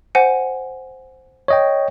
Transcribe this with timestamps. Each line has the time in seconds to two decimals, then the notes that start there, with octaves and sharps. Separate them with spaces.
0.15 C5 F#5 G#5
1.48 C#5 D#5 G5